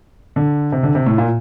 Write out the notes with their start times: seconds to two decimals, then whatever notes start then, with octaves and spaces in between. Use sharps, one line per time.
0.36 D3
0.72 C3
0.83 D3
0.95 C3
1.06 A2
1.18 A#2